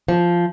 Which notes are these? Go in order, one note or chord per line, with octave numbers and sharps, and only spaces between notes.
F3